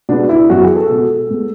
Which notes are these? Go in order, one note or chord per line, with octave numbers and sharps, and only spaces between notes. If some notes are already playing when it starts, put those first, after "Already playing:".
B2 G#3 B3 D4
E4
F#2 E3 B3 F#4
G#4
A4
B2 G#3 B3
A2 G#3 B3